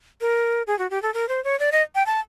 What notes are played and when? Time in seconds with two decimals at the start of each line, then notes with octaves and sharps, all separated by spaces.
0.21 A#4
0.67 G#4
0.79 F#4
0.90 G4
1.02 A4
1.14 A#4
1.28 C5
1.44 C#5
1.59 D5
1.72 D#5
1.95 G5
2.06 A5